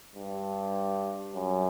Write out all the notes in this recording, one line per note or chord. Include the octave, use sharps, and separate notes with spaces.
G2
F#2